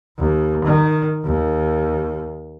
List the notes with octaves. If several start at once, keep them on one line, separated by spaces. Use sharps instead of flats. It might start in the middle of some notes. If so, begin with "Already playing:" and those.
D#2
D#3
D#2